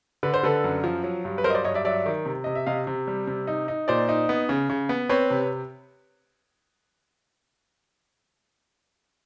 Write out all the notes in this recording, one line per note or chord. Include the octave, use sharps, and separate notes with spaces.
D3 B4
C5
D3 A4 B4
F#2
F3
F#3
G2
B4
F#3 A#4 C5
D#5
C5 D5
G2 C#5 D#5
D5 E5
F#3 D5 E5
D#3
C3
C3 D#5
E5
C3 D#5 F5
C3
G3
C3
D#4
D#4
A#2 C5 D5
D#4
B3
C#3
C#3
B3
C4 B4 C#5
C3